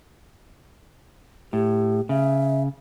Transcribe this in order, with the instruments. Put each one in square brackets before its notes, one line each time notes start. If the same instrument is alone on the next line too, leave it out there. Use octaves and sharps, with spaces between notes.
[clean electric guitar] A2 [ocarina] G4
[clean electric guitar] C#3 [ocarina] E5